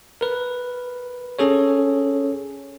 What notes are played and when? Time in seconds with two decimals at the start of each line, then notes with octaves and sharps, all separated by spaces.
0.21 A#4 B4
1.39 C#4 G#4 A4 C#5